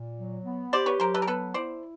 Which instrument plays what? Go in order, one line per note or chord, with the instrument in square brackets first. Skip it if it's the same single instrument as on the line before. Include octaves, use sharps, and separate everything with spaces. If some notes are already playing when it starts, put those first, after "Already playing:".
Already playing: [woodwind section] A#2
F#3
B3
[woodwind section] G4 [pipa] C5 D5
[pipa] B4 C#5
[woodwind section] F#3 [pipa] A#4 C5
[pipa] A4 B4
A#4
[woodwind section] B3 [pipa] A4 B4
[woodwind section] E4 [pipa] C5 D5